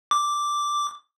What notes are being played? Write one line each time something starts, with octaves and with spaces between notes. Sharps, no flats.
D6